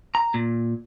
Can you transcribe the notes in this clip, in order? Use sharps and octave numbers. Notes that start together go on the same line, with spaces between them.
A#5
A#2